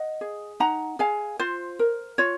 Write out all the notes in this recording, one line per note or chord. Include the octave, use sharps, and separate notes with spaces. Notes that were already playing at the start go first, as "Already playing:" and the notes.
Already playing: D#5 F#5
G#4
D#4 F#5 A#5
G#4 F5 G#5
F4 C5
A#4
F4 C#5